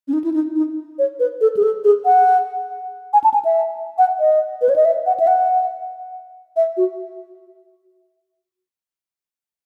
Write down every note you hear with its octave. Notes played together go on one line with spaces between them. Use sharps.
C#4
D#4
E4
D#4
D#4
C#5
B4
A4
G#4
A4
G#4
F#5
G#5
A5
G#5
E5
F#5
D#5
B4
C#5
D#5
E5
F#5
E5
F#5
E5
F#4